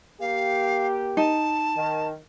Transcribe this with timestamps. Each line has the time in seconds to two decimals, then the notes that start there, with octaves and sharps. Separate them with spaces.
0.20 A#3 G4 F5
1.17 D#4 A5
1.76 D#3